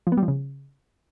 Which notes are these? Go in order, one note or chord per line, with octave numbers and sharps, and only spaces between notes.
F3
B3
G3
F3
C#3